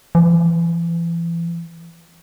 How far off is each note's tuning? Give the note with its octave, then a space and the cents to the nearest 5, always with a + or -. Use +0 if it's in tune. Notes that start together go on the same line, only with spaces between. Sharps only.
E3 +35